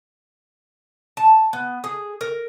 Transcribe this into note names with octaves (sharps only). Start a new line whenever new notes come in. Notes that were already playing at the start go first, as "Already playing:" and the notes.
A5
B3
G#4
A#4